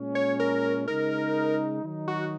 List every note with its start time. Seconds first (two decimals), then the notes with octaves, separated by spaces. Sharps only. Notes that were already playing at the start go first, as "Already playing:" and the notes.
Already playing: A#2 G#3 C#4
0.15 C#5
0.40 A#4
0.87 C#3 G#3 D#4 A#4
1.83 D#3 F#3 D#4
2.08 F#4